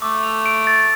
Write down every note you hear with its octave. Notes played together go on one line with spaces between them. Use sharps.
A3 D6
F7
D7
A6